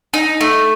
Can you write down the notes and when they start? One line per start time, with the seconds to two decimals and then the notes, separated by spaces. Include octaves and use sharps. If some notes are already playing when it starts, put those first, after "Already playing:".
0.14 D#4
0.41 A3